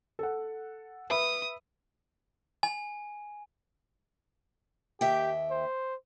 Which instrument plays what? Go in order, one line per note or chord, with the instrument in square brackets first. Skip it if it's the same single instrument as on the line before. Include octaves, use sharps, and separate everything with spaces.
[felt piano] A4 F#5
[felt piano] B4 E5 B5 [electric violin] D#6
[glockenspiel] G#5
[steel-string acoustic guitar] D#2 E5 G5 [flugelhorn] G4
[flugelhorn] C5